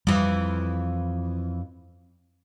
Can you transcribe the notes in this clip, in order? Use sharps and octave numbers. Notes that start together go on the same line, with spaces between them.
F2 E3 G3